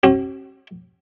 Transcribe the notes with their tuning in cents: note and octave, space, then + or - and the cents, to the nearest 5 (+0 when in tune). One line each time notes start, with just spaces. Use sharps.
C#4 -45 F#4 +45